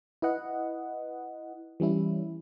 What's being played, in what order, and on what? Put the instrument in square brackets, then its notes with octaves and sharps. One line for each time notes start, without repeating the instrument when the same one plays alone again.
[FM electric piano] E4 B4 D#5 F#5
E3 G3 C#4 E4